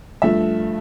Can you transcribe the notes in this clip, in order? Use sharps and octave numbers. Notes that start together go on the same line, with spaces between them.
G2 F3 A3 E5